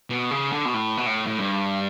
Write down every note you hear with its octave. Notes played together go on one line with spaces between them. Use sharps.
B2
C#3
D3
B2
A2
B2
A2
A2
G2